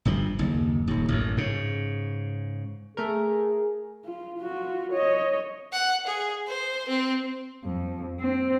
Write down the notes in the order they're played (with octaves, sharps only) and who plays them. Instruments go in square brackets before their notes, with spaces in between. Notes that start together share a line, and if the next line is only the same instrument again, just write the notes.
[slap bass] G1 G2 F3
F#1 D#2
D#1 D#2
A1 F#2
G#2 C#3
[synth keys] A3 A#4 [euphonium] G#4
[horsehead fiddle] F4
F4 F#4
C#5 D#5
[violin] F#5
G#4
C5
C4
[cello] F2
C4